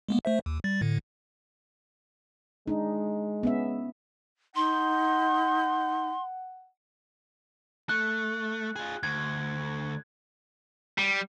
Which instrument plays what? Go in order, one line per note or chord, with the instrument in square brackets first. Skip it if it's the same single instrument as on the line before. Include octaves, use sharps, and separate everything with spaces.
[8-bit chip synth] G#3 A#3 B3
A3 C5 E5
D#2
G3 A6
A2 D3
[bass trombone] G#3 [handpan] D4 D#4
[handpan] B3 C#4 E5
[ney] D#4 [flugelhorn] F#5 [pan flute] C6
[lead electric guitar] A3 [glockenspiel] F#6
[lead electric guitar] F4 G#4
[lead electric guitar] D2 [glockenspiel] G#6
[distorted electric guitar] G3